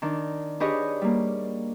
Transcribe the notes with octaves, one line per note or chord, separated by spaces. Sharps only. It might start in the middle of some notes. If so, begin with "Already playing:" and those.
D#3 D4
D4 G4 G#4 B4 C#5 D#5
G3 A#3